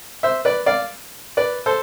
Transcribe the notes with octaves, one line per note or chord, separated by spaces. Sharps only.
C5 E5
B4 D5
D5 F5
B4 D5
A4 C5